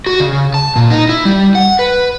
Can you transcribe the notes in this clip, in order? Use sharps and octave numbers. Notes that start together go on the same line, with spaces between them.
F#4
C#3
A5
A#2
D#4
E4
G3
F#5
B4